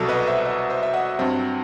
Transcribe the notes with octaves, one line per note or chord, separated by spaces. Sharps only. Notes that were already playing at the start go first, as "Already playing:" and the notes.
Already playing: C2 B2 F#3 A4
B4 D#5
C5 E5
B4 D#5
C5 E5
E5
D#5 F#5
G2 F#3 C4